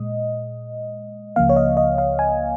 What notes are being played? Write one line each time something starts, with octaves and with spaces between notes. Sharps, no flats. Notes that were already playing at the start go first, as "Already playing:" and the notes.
Already playing: A#2 G#3 D#5
C#2 C#3 F3 A#3 F5
C#5
D#5
D#5
F5
G#5